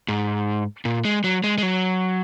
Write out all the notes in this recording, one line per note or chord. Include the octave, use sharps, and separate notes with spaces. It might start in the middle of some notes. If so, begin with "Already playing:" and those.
G#2
A#2
G#3
F#3
G#3
G#3
F#3